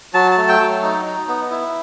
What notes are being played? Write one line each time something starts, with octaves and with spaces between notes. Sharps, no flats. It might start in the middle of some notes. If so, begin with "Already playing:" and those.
F#3 A5
A5
A3
G5
F#3
D#4
D#4
B3
E4